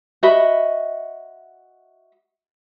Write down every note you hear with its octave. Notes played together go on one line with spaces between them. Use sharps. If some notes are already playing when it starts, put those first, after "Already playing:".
F#4 D#5 E5 B5